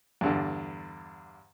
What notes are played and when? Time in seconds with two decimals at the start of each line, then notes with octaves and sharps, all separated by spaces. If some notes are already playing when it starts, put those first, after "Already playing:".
0.21 E2 G2 D3